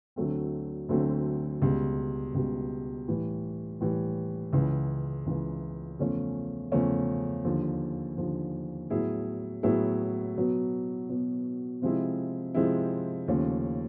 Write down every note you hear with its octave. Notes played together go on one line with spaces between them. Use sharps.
D2 D3 F#3 A3 C4
D2 D3 F#3 A3 C4
C#2 B2 G3
C#2 B2 G3
A2 E3 G3
A2 E3 G3
C#2 C#3 E3
C#2 C#3 E3
E2 C#3 F3 A3 C#4
E2 C#3 F3 A3 C#4
D#2 D3 F3
D#2 D3 F3
A2 F#3 B3 E4 G#4
A2 F#3 B3 E4 G#4
B2 F#3 B3
B2 F#3 B3
C3 F3 G#3 C4 E4
C3 F3 G#3 C4 E4
D#2 C#3 F3 A3 C#4